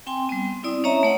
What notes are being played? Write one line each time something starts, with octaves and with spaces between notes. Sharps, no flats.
C4 G5 G#5 C6
G3 B3
C4 E4 D5 D#6
C#4 C#5 D#5 E5 A#5
A3 C#5 F#5